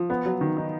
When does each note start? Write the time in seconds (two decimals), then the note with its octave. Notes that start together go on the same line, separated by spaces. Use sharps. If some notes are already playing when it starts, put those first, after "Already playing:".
Already playing: F3
0.10 B3
0.26 F#3
0.41 D#3
0.57 D#4